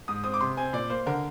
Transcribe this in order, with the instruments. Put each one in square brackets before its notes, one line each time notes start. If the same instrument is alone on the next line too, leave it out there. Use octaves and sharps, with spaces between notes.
[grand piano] G#2 D#6
C4 D#6
D6
C3 C6
C4 G#5
A#2 D5
A#3 C5
D3 A#4